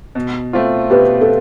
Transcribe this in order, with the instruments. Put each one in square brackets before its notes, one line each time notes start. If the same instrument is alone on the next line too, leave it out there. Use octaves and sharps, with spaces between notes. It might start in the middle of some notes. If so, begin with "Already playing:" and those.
[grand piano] B2
A3 C4 F4
[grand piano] B2 [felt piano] G4 B4
[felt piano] A4